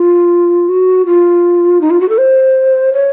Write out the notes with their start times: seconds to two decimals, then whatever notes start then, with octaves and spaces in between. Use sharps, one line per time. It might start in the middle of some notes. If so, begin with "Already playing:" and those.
Already playing: F4
0.68 F#4
1.06 F4
1.81 D#4
1.90 F4
2.00 F#4
2.09 A4
2.18 C5
2.93 C#5